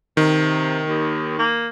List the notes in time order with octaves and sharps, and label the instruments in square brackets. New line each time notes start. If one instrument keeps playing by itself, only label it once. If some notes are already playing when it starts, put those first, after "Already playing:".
[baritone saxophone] C3 [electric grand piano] D#3
[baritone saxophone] D#2
A#3